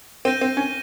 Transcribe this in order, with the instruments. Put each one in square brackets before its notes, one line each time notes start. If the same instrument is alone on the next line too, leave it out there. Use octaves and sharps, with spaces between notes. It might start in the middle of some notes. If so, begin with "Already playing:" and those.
[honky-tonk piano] C4 [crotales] G6 A#6 D#7 G7
[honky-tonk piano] C4
C#4